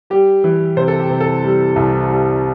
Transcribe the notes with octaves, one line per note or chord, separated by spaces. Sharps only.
G3 G4
E3
C3 C5
A4
G4
C3
A4
G3
C2
G3